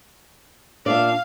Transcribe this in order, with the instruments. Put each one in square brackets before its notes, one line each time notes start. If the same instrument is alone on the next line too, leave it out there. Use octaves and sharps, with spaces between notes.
[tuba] A#2 [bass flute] D4 [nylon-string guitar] D5 E5 [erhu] F5